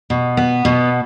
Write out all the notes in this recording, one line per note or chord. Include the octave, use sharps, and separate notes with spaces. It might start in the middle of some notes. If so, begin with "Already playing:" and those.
B2
B3
B2